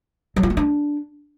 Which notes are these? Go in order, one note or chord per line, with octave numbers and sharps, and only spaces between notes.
F#3
F4
A3
D4